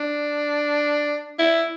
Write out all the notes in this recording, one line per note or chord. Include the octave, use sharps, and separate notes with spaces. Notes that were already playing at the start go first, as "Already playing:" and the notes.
Already playing: D4
E4